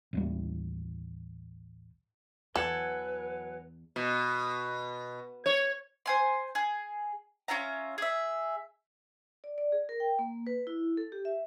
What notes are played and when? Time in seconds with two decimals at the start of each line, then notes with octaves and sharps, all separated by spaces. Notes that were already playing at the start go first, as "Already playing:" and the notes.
0.13 A1 D#2 G3
2.56 E2 F#3 A4 B4 F#5 G#5
3.96 B2
5.46 C#5
6.06 C5 G#5 C6
6.55 G#4
7.48 C#4 F4 E5 A#5
7.98 G#4 E5
9.44 D5
9.58 D5
9.72 G#4
9.89 A#4
10.00 G5
10.19 A#3
10.47 B4
10.67 E4
10.97 A4
11.12 G4
11.25 E5